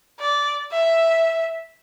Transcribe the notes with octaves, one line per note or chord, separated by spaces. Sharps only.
D5
E5